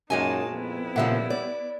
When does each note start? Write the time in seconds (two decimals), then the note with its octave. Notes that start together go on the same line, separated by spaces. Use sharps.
0.10 F#2 A#2 G#3 D#4 F#4 G#5 A5
0.51 F2 B3 E4
0.96 A#2 C#3 F3 G3 E5 F#5
1.30 D5